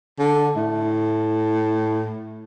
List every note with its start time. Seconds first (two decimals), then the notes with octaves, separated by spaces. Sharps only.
0.19 D3
0.56 A2